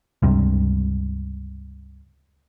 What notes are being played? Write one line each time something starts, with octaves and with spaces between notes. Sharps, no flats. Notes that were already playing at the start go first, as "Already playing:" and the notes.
C#2 G2 C3